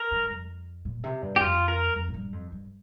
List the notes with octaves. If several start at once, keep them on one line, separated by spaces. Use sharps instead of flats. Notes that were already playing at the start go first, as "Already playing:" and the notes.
Already playing: A#4
G2
F2
A#2
C3
G2
G4
F2 F4
A#4
F2
A#2
G2
F2
G2